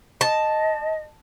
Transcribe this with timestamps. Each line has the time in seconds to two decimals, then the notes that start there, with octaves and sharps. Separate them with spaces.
0.21 D#5 A5